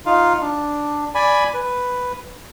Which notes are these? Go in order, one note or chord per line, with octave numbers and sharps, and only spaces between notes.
D#4 F4 F5
D4
D5 G#5 B5
B4